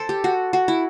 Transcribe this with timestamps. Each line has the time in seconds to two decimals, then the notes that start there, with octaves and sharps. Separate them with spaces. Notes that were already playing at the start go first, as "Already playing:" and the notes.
Already playing: A4 C5
0.09 G4
0.24 F#4
0.53 F#4
0.68 E4